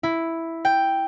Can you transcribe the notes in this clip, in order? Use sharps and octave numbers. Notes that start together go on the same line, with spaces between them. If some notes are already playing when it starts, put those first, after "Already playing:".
E4
G5